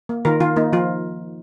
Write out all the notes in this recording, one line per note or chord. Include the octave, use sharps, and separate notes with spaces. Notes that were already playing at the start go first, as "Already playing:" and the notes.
A#3
D#3 F4 A#4
D#3 F4
A#3 D#4
F3 F4